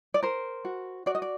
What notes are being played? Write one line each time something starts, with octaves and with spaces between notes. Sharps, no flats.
D5
A#4 C5
F#4
F#4 D5
D#5
D5